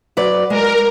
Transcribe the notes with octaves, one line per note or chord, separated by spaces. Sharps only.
F#3 B4 D5
G#3 A#4